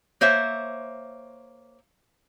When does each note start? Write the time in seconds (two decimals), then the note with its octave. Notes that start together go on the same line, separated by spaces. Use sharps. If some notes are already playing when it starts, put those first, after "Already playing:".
0.21 A#3 C5 C#5 E5